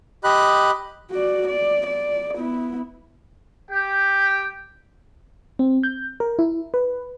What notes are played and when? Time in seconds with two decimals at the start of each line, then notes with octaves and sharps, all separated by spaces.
0.24 G4 D#5 B5 F#6
1.11 F#4 D5
1.47 D5
1.86 D5
2.35 B3 E4
3.70 G4 G5
5.59 C4
5.83 G6
6.20 A#4
6.39 E4
6.74 B4